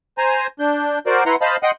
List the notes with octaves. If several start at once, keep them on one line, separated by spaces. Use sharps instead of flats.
C5 G#5 A#5
D4 G6
F#4 A#4 C5 D5
E4 B4 F#5 A#5 C6
C5 D#5 F5 A5 B5
D#5 F#5 G5 C6 D#6 F#6